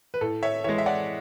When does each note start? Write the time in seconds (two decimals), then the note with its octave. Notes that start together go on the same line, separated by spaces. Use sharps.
0.14 B4
0.21 A2 A4
0.43 C#5 E5
0.64 E3 G#3 C#5 E5
0.78 E5
0.86 D5 F#5